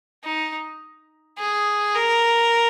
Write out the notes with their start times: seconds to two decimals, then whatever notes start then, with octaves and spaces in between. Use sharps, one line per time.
0.24 D#4
1.38 G#4
1.95 A#4